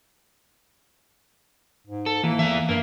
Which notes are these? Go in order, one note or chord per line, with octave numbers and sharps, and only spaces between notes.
G#2
A4
E3 A#3
E2 G2 E5
G2 A#3